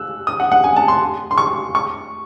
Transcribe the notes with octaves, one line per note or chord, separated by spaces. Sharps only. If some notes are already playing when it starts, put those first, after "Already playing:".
Already playing: E6 F#6
D#6
F#5
F#5
G#5
A5
C6
C6
C#6
C#6